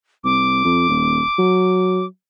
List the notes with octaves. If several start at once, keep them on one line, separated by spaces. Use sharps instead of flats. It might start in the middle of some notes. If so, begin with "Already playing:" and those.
C2 D6
F2
D#1
F#3